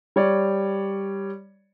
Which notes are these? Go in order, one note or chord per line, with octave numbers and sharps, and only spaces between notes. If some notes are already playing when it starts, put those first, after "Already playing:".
G3 C#5 D5